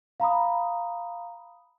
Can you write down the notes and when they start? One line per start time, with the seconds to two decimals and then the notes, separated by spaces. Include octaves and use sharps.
0.20 F5 A#5 B5 D#6